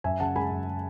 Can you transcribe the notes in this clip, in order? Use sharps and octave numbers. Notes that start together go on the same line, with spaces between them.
F#2 E5 G#5
C#3 F#5 A5
G#3 G#5 B5
F#2